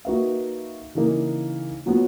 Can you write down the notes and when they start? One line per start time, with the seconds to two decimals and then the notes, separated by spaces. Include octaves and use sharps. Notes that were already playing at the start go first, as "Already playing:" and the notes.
0.05 A#3 D#4 F#4 B4 E5
0.95 C#3 E3 A#3 D#4 A#4
1.86 A#2 F#3 B3